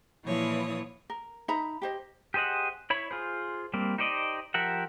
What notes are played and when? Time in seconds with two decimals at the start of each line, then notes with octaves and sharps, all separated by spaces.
0.24 A#2 E3 F3 E4 C#5 D#6
1.10 A#4
1.48 D#4 E5 A#5 B5
1.82 G4 C5 D#5
2.34 G4 G#4 C5 D#5 F#5
2.90 E4 C#5 B5
3.11 F4 G#4 C5
3.74 G3 A#3 C4
3.98 D#4 G4 C5 D5 D#5
4.54 F3 G4 A#4 E5 F#5